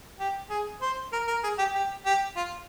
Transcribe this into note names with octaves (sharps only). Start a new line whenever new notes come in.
G4
G#4
C5
A#4
A#4
G#4
G4
G4
G4
F4